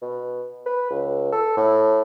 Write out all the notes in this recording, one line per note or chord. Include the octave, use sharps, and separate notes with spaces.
B2
B4
C#2
A4
A2